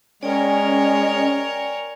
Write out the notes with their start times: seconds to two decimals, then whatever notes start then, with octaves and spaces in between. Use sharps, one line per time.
0.23 G#3 C#4 A#4 C#5 D5 G5 G#5